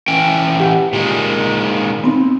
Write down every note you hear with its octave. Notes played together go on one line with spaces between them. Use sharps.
E3 C#4 G5
G4 F#5
A#2 D#3 G#3
B3 C4 D#4